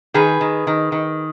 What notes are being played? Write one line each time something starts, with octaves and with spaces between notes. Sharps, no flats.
D#3 G#4 B4
D#3
D#3
D#3